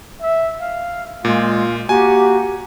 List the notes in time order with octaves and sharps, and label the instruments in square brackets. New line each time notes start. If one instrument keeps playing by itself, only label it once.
[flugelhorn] E5
F5
[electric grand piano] A#2 [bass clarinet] G#3 [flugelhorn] F4
[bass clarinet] A#3 [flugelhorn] F#4 [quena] G4 [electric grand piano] G#5